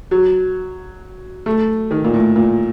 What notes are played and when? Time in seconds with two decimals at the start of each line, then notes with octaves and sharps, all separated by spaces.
0.11 F#3
1.46 A3
1.91 D#3
2.04 A#2
2.14 A2
2.36 A#2